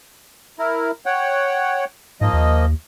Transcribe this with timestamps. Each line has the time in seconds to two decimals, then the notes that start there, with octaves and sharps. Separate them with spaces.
0.59 E4 A#4
1.06 C#5 F#5 G5
2.21 G#2 F3 A#3 D#5
2.33 D#2